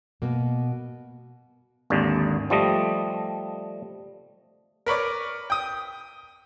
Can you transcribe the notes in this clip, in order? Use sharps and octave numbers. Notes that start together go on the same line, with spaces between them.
B2 A#3
G#1 D#2 D3
F3 G3 A3 D#5
A#4 B4 C#5 D5
G5 D#6